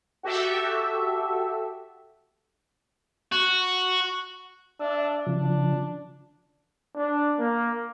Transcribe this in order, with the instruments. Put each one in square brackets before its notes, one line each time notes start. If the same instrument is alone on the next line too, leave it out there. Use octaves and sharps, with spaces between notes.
[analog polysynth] F#4 G4 A4 E5
[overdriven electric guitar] F#4
[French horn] D4 [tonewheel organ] E5
[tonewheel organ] C#3 F3 [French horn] D4
[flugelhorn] D4
A#3